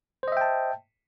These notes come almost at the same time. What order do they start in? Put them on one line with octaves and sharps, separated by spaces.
C5 D#5 E5 G5 A5